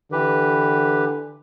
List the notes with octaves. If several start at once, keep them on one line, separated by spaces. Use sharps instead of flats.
D3 E3 G4 B4